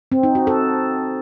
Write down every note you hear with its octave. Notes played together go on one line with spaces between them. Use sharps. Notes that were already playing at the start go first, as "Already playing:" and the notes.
C4
D#4
F#4
A4